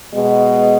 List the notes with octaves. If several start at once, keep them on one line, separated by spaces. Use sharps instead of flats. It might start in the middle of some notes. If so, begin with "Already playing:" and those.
B2 G#3